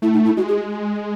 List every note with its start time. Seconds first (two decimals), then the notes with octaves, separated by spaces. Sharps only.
0.02 A3 E4
0.13 D#4
0.25 E4
0.37 G#3 F#4
0.48 G#4